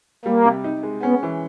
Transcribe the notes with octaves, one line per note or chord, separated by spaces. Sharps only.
G3 A#3
C3
D#4
G#3
B3 C#4
E3